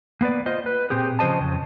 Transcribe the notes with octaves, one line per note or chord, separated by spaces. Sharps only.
A#3 B3 B4 D5
F4 C5 D#5
B4
A#2 C4 G4 G#4
C#3 F3 C5 D#5 A5
F2 C#3